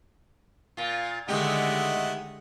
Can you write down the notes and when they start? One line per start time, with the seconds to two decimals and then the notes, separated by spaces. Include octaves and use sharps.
0.77 A#2 F4
1.28 D3 D#3 G#3 A3 E4 G4 D#5 F#5